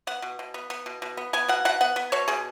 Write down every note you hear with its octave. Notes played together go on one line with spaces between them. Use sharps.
B3 F#5
B2
B2
B3
B3
B2
B2
B3
B3 G#5
B2 F#5
B2 F#5
B3 F#5
B3
B2 C#5
B2 G#4